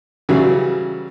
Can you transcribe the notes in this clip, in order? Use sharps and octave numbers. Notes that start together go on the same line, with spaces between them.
C#3 E3 F#3 G3